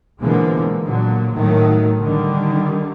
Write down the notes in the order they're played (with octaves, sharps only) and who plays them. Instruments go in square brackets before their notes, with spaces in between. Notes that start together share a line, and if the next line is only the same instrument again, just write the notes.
[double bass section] B2 D3 E3 F3 G#3 A#3
A#2 D3 F#3
A2 D#3 F#3 A3
D3 D#3 G3